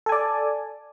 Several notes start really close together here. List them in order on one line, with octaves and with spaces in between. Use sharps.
A4 G#5 D5